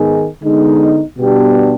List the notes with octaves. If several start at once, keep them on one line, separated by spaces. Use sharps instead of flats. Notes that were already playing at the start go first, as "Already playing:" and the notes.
Already playing: G#2 D#3 B3 D#4 G#4
D3 G#3 B3 D#4
B2 G3 B3 D4 G4